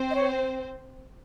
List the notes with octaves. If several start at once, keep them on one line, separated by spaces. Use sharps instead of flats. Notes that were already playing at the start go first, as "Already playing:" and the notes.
Already playing: C4 C5
D#5
C#5